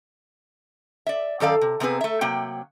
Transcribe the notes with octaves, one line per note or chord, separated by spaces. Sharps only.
D5 E5
F#2 D#3 A4 D5 F5
C3
C3 B3 C4 G#4 B4
A3 E5
C3 F#3 A#3 G5